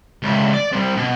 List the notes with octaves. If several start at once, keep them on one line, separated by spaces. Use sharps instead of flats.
C#2 E4
D5
C3 G3
B2